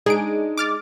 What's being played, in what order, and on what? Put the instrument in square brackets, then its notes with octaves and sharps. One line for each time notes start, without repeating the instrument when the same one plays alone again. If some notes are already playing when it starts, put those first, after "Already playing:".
[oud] G#3 D4 D#4 [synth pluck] G#4 D7
[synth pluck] D6 F6 A6